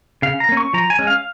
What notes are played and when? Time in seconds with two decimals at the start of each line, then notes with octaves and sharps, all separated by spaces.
0.22 C#3 F5
0.40 A#5
0.49 A#3 C#4
0.57 C#6
0.73 F3 A#5
0.90 G#5
0.99 G#3 C#4
1.07 F5